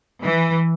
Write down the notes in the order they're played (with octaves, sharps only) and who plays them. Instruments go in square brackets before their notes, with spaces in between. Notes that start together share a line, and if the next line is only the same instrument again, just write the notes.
[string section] E3